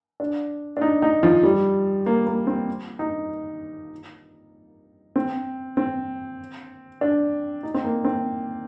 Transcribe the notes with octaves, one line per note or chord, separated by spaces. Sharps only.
D4
D4
D#4
D#4
F3
G3
A#3
A#3
C4
D#4
C4
C4
D4
D#4
C4
A#3
C4